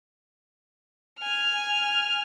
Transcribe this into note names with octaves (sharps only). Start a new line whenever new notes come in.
G#5 F6